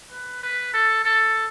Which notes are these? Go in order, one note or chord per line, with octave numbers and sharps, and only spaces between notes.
B4
B4
A4
A4